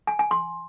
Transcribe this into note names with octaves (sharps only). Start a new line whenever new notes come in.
G#5
G#5
C6